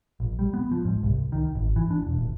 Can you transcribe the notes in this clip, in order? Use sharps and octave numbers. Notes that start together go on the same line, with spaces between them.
A#1
G3
B3
F3
G#2
C2
D#3
G#1
E3
D4
E1
D#1